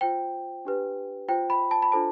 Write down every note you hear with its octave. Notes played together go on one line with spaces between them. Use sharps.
F4 C5 G5
D4 G4 B4
F4 C5 G5
B5
A5
B5
D4 F4 A4 C5 A5